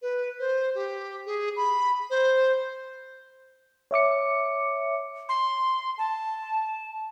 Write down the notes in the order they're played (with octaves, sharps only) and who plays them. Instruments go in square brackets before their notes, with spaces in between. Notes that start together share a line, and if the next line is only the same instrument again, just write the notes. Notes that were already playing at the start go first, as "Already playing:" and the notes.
[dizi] B4
C5
G4
G#4
B5
C5
[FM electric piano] C#5 E5 D6 C#7
[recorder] C6
A5